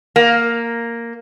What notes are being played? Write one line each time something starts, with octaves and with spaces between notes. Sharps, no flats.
A#3